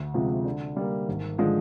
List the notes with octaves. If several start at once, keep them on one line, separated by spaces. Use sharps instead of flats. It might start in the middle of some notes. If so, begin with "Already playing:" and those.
Already playing: D2
C3 F3 G#3
D3
G3 A#3
G#1
D3 F3 G#3